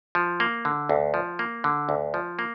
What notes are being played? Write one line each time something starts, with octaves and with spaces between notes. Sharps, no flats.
F3
A#3
D3
D2
F3
A#3
D3
D2
F3
A#3